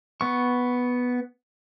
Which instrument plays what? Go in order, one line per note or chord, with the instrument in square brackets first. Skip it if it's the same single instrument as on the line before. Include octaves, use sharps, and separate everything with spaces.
[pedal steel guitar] B3 C#6